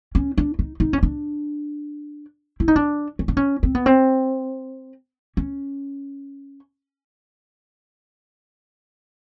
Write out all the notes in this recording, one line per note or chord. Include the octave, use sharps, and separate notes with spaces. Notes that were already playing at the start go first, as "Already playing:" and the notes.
C#4
D4
D#4
D#4
C#4
D4
E4
D#4
D4
C#4
D4
C#4
C4
B3
C4
C#4